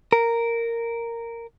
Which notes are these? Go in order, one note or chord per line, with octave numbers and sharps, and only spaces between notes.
A#4